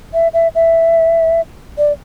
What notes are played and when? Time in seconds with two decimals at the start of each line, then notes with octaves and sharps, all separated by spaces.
0.14 E5
0.34 E5
0.55 E5
1.78 D5